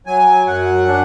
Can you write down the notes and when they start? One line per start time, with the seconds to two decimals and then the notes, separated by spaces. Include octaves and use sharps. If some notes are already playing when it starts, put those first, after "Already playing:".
0.06 F#3 G#5
0.46 F#2 F#5
0.88 D4